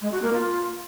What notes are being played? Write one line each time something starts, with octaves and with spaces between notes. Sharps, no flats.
G#3
F#4
A#3
F4